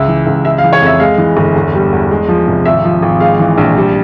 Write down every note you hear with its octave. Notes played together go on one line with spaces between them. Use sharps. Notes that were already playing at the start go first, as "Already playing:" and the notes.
Already playing: C#2 E5
E3
C#2
G#3 E5
F5
E3
C#5
F2 E5
G#3 F5
E3
G1
E2
G3
E2
G#3
F3
C2
G#1 E5
F3
G#1
G#3 F5
E3
A#1
G3